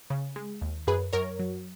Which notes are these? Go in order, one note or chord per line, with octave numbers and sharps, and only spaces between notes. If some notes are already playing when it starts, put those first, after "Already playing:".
C#3
G#3
D#2
F#2 G#4 B4
F#2 A#4 C#5
F#3